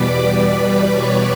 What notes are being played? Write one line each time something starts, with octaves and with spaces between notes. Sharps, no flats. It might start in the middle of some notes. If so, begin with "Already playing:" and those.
Already playing: E2 B2 G3 B4 D5 B5 D6
D5 D6
C#5 C#6